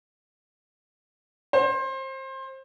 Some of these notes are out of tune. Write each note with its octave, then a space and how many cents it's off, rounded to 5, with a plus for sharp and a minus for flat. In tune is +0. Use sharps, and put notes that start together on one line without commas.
C5 +25